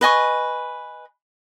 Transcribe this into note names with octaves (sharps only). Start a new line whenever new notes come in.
B4 D#5 G#5 C#6